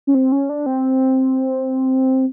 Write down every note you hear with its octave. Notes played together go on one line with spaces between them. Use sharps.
C#4
C4
C#4
D4
C4